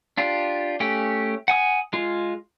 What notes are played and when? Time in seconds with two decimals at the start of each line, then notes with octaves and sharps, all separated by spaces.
0.17 D4 F4 G4
0.80 A3 C#4 G4
1.48 F#5 G#5 D#6
1.93 G#3 F4